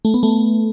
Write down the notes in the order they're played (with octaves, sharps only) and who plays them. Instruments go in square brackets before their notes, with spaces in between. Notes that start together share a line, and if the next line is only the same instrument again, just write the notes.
[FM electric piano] A3
B3
A3